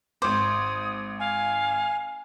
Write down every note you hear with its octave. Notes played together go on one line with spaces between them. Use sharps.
G#1 C5 D6 D#6
F5 G#5